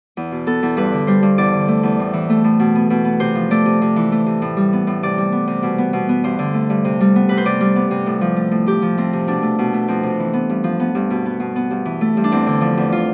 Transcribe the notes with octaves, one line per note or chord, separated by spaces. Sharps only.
E2
B2
B3 A4
E2
G2 B4
D3
G3 C5
G2
E2 D5
D3
A3
E2
A2
E3
A3
A2
B2
B3
B2
B3
C3 C5
F3
A3 D5
C3
C3
E3
A3
C3
A2
G3
B3
A2
C3 D5
G3
B3
C3
B2
B3
B2
B3
G2 C5
D3
A3
G2
C3
G3
B3
C3 B4
C5
C3 D5
G3
B3
C3
A2
F3
A3
A2
C3 G4
F3
A3 C4
C3
B2 D4
A3
B2
A3
F2 C4
C3
E3
B3
G2
F3
B3
G2
B2
B3
B2
B3
G2
E3
A3
G2
D4
E2 C4
D3
F3 D4
E2
F4